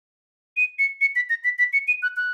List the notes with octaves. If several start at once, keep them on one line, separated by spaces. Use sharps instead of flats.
D#7
C#7
C#7
B6
A#6
B6
B6
C#7
D#7
F#6
F#6